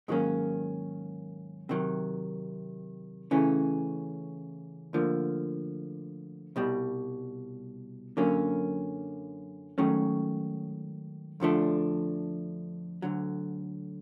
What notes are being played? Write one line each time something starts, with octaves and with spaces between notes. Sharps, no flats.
G#2 D#3 F#3 A#3 C#4
C3 D#3 F#3
C#3 E3 A3 C#4
D2 D3 F3 A#3
C2 B2 G3
F#2 D3 F#3 A#3 C#4
G#2 D#3 F#3 A3 C#4
F2 D3 F3 A3 D4
D2 D3 F#3